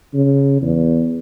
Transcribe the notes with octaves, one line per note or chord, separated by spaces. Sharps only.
C#3
E2